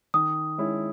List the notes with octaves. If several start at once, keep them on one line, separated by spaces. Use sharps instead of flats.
D#3 D#6
G#3 C#4 E4